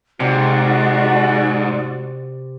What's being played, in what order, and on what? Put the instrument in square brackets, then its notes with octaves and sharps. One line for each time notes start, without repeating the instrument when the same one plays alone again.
[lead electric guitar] G#2 [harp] C3 [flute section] F#4 D5